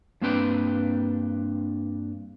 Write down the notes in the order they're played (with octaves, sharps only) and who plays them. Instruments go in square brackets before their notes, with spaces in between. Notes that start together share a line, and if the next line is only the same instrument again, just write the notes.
[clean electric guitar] G2 A#3 C4 D4 B4 G5